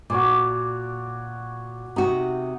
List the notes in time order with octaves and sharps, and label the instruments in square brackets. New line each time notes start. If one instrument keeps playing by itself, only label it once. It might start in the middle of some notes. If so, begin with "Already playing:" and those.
[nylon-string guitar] A#2 [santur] F#4 C#5 D5
[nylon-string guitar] C3 F#4 [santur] D#4